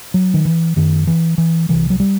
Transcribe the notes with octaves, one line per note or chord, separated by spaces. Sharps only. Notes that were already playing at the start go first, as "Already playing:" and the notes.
F#3
D#3
E3
F#2 D#3
E3
E3
C2 C3 E3
F#3
G3